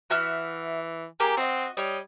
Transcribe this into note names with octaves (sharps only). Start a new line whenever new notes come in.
E3 F#4 E5 F6
A#3 G4 G#4
C4 F#4 D#5
G3 C#5 D#5